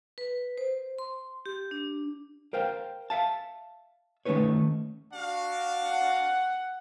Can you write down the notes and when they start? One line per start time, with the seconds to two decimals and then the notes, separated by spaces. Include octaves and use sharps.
0.18 B4
0.58 C5
0.98 C6
1.46 G4
1.71 D4
2.53 A#4 C5 F5 G5
3.10 E5 F5 A5
4.25 D#3 A3 C#4 D#4 B4 C#5
5.13 D4 F#4 F5
5.83 F#5